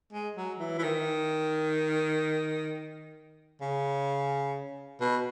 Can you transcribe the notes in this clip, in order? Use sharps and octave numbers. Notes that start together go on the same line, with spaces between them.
G#3
F#3
E3
E3
D#3
C#3
B2